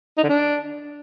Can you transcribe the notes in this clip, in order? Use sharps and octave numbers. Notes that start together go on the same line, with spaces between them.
D#4
D3
D4